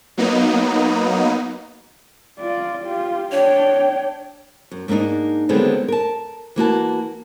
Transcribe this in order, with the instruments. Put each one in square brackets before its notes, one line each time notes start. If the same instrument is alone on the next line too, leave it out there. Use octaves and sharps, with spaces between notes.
[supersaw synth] F#3 A#3 B3 D#4
[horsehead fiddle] F4 D5
F4 G4
[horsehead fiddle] D4 G5 [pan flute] C#5
[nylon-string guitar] F#2
G#2 A#3 C4 D4 D#4
D3 D#3 F#3 G#3 B3 C4
A#4 A5
E3 A#3 F#4 A5